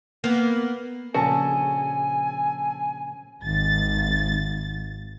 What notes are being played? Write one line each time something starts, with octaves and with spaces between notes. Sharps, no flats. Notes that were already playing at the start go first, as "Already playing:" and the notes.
A#3 B3
A#1 C#3 F#4 A4 G#5 A5
G#1 A6